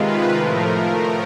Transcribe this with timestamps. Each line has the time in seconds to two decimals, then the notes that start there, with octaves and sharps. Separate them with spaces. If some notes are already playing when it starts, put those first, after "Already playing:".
Already playing: C3 D#3 G#3 F4 B4
0.34 A2 F3 A3 A#4